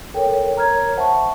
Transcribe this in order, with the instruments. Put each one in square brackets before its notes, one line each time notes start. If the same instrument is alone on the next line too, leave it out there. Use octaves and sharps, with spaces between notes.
[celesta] A4 G5 [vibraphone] A#4 C#5
[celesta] A#5 F6 G#6
[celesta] C5 F#5 A5 [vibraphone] E5 C#6